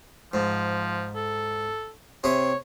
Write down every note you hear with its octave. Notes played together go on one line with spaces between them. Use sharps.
G#2 F3
A4
C3 G#4 C#5